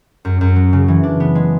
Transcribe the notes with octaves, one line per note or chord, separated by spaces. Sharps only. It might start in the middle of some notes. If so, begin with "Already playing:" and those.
F#2
F#2
F#3
C#3
E3
D4
B3
G#3